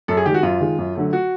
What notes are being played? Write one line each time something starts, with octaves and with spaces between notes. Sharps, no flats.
F#2 A4
G#4
D#3 G4
G#3 F#4
F#2 F4
D#3 G#3
F#2
D3 F#3 A3
F#4